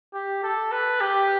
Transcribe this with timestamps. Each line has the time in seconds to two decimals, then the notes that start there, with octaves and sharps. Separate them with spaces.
0.14 G4
0.43 A4
0.72 B4
1.01 G4